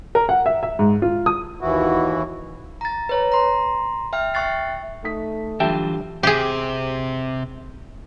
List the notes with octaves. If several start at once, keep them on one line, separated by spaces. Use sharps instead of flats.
A#4
F#5
E5
E5
G#2
F4
D#6
D#2 E3 E4 F#4
A#5 A6
B4 C#5 A#5
A#5 C6
E5 G5 F6
E5 G5 C#6 F#6 A6 C7
A3 D#4 D#6 B6
D3 E3 F#3 G3 F4 E5 G5 A5
C3 G4 G#4